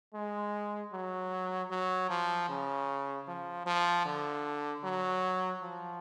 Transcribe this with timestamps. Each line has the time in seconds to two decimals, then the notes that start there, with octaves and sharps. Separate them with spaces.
0.14 G#3
0.93 F#3
1.71 F#3
2.10 F3
2.49 C#3
3.28 F3
3.67 F3
4.06 D3
4.84 F#3
5.63 F3